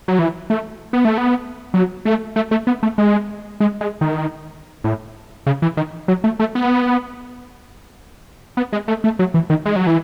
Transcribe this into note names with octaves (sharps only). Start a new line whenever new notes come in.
F#3
E3
A3
B3
A3
B3
F#3
A3
A3
A3
B3
A3
G#3
G#3
G#3
D#3
A2
C#3
E3
D#3
F#3
A3
A3
B3
B3
G#3
A3
A3
F#3
E3
D#3
G#3
F#3
E3